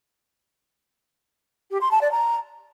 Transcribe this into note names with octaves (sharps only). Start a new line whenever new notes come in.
G4
C6
A5
D5
A#5